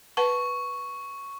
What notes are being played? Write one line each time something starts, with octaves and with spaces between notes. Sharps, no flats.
B4 F#5 A5 C#6